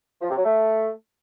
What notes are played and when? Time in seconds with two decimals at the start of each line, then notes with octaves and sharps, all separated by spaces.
0.21 F3
0.29 C3
0.37 F#3
0.45 A3